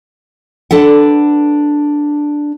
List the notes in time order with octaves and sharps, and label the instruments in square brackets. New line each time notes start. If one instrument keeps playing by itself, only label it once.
[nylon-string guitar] D4 A4 B4 F#5